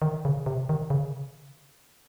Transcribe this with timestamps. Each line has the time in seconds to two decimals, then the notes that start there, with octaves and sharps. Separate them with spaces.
0.02 D#3
0.25 C#3
0.46 C3
0.69 D#3
0.90 C#3